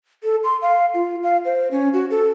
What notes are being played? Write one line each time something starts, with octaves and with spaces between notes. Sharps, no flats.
A4
C6
F5
F4
F5
C5
C#4
F#4
A4